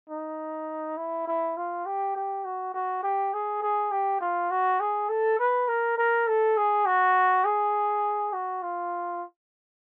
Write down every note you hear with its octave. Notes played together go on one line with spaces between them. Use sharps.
D#4
E4
E4
F4
G4
G4
F#4
F#4
G4
G#4
G#4
G4
F4
F#4
G#4
A4
B4
A#4
A#4
A4
G#4
F#4
G#4
F#4
F4